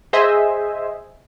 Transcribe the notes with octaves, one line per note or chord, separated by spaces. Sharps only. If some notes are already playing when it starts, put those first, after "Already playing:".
G#4 C5 D#5 E5 G#5